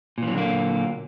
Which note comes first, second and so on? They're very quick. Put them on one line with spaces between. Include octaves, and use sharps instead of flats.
A#2 E3 F#3 D3 A#3